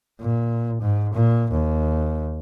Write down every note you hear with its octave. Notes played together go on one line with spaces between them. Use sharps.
A#2
G#2
A#2
D#2